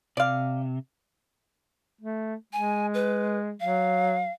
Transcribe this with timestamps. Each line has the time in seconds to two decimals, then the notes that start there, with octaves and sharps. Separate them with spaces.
0.17 C3 D5 F5
2.01 A3
2.53 G#3 G#5
2.94 B4
3.60 F#3 F5